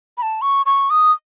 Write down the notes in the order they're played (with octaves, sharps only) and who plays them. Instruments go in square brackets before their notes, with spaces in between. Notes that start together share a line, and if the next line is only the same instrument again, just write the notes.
[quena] B5
A5
C#6
C#6
D#6